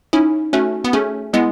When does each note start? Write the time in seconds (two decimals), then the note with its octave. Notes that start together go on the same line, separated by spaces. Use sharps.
0.13 C#4 D#4 E4
0.53 A3 C#4 F#4
0.84 B3
0.93 A3 C#4 G#4
1.33 G#3 B3 E4